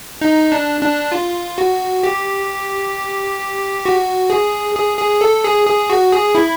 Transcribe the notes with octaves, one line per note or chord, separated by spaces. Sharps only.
D#4
D4
D4
F4
F#4
G4
F#4
G#4
G#4
G#4
A4
G#4
G#4
F#4
G#4
E4